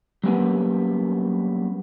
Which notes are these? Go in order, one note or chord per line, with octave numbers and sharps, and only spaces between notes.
F#3 G3 A#3 B3 C#4